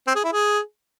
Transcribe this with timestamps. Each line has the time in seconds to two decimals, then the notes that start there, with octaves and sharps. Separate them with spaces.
0.07 C4
0.16 G#4
0.24 E4
0.32 G#4